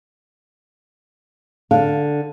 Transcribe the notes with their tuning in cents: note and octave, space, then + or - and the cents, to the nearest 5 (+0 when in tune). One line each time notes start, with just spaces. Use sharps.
D3 +0 F5 +0 A5 +0